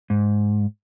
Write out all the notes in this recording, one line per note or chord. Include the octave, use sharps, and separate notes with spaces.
G#2